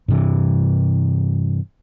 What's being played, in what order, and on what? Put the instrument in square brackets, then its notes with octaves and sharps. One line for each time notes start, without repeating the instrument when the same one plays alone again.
[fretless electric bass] G2 C3 E3